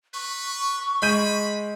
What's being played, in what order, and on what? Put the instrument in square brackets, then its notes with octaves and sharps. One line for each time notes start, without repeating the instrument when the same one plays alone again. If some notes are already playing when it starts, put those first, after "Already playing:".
[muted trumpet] B4 [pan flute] C#6
[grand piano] G#3 G6 D#7 [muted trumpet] B5